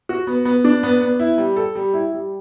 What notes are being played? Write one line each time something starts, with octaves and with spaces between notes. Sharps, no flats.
F#4
B3
B3
D4
B3
B3
E4
G3
A4
G3
E4
G3